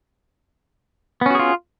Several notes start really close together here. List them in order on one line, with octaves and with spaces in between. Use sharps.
B3 C#4 F#4 G#4 F4